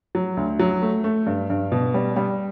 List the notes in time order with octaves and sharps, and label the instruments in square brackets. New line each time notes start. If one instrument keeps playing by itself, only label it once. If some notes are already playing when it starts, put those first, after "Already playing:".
[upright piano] F#3
D2
F#3
A3
A3
G2
G2
B2
G3
G3